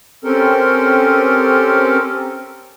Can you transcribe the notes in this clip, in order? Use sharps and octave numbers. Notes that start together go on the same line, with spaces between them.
C4 C#4 G4 A4 A#4